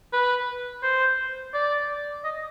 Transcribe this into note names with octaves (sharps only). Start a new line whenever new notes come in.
B4
C5
D5
D#5